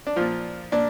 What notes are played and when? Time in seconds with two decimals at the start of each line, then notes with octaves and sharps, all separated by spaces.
0.07 D4
0.16 A#2 F3 F4
0.72 A#2 D4